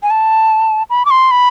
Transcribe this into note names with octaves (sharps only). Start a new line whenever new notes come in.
G#5
A5
B5
D6
C6
B5